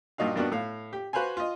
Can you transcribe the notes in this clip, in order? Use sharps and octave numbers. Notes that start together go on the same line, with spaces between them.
G2 A#2 D#4 F#4 F5
G2 A#3 B3 D4 D#4 F#4
A2 F5
G4
F#4 B4 C5 F5 G#5
F4 D#5